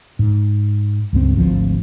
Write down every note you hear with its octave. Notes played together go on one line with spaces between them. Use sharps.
G#2
C#2 G2 C4
G#1 D2 F3 C4